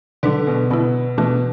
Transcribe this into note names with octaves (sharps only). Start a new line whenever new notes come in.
D3 F#3 D4 B4 D5
B2
B2 D3 B3 E4
B2 E3 A3 D4 F#4